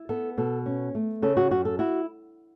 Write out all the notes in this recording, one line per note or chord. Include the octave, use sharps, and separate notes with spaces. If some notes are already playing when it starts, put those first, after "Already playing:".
Already playing: E4
B3 A4
B2 A4
C#4
A3
C#3 A4
F#4
F#2 F#4
A4
E4 F#4